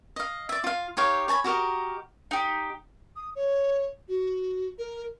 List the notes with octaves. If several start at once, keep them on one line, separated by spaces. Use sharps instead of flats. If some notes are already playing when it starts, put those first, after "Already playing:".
D#5 F5
D5 E5
F4 F5
D#4 G4 C#5 F5
C#5 G#5 A5 B5
F#4 G4 A#4 D#5
D#4 G4
D#6
C#5
F#4
A#4